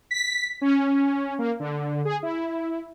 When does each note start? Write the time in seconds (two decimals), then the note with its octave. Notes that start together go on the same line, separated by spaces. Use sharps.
0.11 B6
0.61 C#4
1.39 A#3
1.60 D3
2.05 G#4
2.23 E4